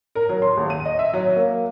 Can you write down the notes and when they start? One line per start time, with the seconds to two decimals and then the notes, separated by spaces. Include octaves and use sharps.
0.15 A#4
0.29 F#3
0.42 C6
0.57 D#1
0.70 D#7
0.85 D#5
0.99 E5
1.13 F#3
1.36 A#3